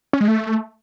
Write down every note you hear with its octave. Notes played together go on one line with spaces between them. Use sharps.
C#4
G#3
A3